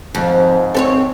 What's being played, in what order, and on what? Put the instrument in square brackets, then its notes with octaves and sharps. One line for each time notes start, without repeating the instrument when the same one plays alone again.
[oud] F2 [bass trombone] G#2 [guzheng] D#3 F3 G#4
[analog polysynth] C4 [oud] A4 B4 C#5